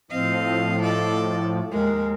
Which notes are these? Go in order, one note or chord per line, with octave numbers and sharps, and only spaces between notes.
A2 F3 C4 D#5 F5
A4 D5 D#5
D#2 G#3 A#4